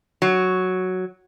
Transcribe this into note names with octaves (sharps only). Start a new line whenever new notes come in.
F#3